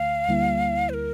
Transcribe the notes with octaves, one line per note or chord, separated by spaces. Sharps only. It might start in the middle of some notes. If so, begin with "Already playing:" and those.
Already playing: D2 D3 A3 F5
D2 D3 G3 A#3 E4
C5
A#4